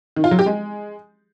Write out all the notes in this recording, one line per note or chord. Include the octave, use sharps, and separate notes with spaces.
D#3
F4
F#3
G4
G#3